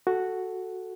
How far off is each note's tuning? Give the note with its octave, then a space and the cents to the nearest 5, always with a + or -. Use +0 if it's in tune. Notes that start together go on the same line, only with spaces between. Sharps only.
F#4 +0 A4 +0